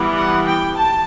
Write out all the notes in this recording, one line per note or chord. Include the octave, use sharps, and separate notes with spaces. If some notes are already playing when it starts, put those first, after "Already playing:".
Already playing: E3 G3 B3
F#5
G5
A5